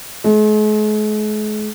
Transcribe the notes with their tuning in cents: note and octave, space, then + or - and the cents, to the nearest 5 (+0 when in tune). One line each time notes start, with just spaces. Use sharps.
G#3 +45